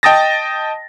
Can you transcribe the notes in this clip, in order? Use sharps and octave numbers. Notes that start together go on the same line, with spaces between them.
D#5 G5 A5 D#6 A6 A#6